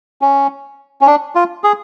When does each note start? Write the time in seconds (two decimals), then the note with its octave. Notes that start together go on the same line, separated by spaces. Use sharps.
0.22 C#4
1.01 C#4
1.07 D4
1.35 F4
1.64 G#4